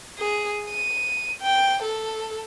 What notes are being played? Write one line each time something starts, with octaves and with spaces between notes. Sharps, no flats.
G#4
D#7
G5
A4